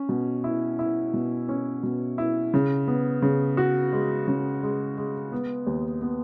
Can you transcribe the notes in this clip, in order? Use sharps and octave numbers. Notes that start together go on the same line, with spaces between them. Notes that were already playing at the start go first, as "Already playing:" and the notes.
Already playing: C#4
B2
E4
E4
B2
C#4
B2
E4
C#3
B3
C#3
F#4
G#3
C#3
G#3
G#3
B3
D#2
B3